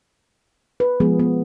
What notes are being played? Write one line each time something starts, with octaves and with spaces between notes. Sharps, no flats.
B4
F3 G#3 B3 G#4
B3